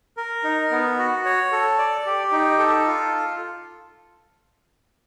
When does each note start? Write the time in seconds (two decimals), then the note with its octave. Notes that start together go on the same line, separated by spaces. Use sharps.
0.17 A#4
0.44 D#4
0.71 B3
0.99 F#4
1.25 C#5
1.52 A4
1.78 D5
2.06 G4
2.32 D#4
2.59 A4
2.86 F4